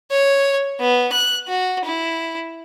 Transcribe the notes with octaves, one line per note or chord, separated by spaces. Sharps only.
C#5
B3
F#6
F#4
E4